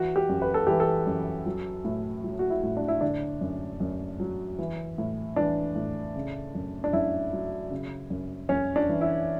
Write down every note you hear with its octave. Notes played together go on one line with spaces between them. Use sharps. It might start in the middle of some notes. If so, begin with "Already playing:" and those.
Already playing: E3 F#4
G4
F#2
B4
A4
E3 G4
A4
F#2
F#3
A2
F#3
F#4
E4
A2
D4
E4
D3 D4
F#2
F#2
F#3
E3
A2
E3 D4
A2
C#3
F#2
D4
F#2 E4
F#3
C#3
F#2
F#2 C#4
D4
E3
E4